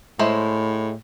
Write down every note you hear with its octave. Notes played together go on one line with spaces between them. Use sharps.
A2 G#3 E4 C5